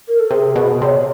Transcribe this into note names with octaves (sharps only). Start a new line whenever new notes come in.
A#4
A4
C3 G#4
B2
C3 C#5 D5